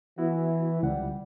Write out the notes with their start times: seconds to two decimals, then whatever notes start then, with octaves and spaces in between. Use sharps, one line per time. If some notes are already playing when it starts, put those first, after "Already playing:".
0.18 E3 B3 E4 F#4
0.83 C#2 G3 F#5